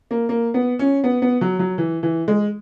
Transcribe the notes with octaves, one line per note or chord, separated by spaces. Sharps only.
A#3
A#3
B3
C#4
B3
B3
F#3
F#3
E3
E3
G#3